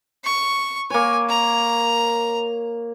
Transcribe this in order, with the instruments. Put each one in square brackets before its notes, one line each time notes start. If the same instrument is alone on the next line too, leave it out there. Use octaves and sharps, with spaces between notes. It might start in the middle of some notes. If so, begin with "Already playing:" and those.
[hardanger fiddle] C#6
[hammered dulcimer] A#3 C#5 [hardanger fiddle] G#5
[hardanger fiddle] A#5